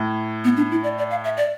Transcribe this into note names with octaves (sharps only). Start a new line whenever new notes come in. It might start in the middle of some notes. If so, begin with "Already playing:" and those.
Already playing: A2
B3
D4
E4
D5
D5
F5
E5
D5